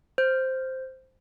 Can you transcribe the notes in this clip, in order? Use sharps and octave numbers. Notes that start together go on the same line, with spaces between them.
C5 G6